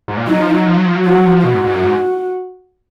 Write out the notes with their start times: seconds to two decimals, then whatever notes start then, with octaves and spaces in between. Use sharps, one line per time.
0.08 G#2
0.17 A#2
0.27 F#3 D#4
0.40 F3
0.54 F#3
0.66 F3
0.77 F#3
0.85 F3
0.96 F#3
1.06 F3 F#4
1.15 F#3
1.25 F3
1.44 B2 F#4
1.54 G#2
1.64 G#2
1.73 F#2
1.84 G#2